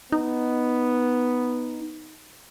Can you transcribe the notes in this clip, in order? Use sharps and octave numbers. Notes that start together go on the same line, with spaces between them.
B3 D#4